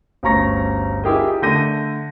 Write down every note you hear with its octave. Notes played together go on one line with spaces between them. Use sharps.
G1 D2 C#4 A#5 C#6 A#6
E4 F4 G4 G#4 A#4 D#5
D3 A3 G6 A#6 D#7